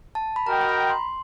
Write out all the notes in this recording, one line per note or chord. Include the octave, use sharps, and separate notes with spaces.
A5
B5
F#4 A#4 D#5 G5 A#5
A#5
B5
C6